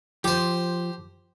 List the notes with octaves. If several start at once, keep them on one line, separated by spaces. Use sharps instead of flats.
F3 G4 C5